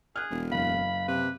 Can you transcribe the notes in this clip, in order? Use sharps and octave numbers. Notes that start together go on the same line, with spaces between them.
G#4 F6 F#6
E1
F#1 F5 B5
C3 B4